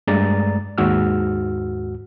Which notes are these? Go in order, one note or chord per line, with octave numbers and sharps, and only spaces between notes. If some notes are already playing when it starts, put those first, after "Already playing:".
G2 G#3 A3 D5 A#5 A6
D#2 G#2 F#4 E6 F6